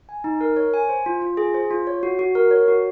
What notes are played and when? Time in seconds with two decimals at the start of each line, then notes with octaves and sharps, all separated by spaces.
0.09 G#5
0.24 D#4
0.41 A#4
0.56 C#5
0.74 G#5
0.89 C5
1.06 F4
1.22 F4
1.37 G#4
1.54 C5
1.71 F4
1.87 C#5
2.03 F#4
2.19 F#4
2.35 A#4
2.51 C#5
2.68 F#4